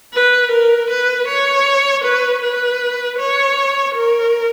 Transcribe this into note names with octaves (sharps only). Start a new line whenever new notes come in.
B4
A#4
B4
C#5
B4
B4
C#5
A#4